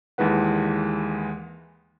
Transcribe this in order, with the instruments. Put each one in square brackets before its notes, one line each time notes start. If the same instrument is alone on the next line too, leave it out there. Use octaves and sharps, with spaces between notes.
[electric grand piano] D#2 E3 G#3 B4 F#5